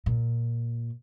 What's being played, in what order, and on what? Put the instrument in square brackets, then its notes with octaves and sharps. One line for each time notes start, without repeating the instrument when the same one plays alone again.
[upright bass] A#2